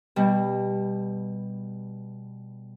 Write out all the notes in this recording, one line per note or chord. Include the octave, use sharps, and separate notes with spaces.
B2 G3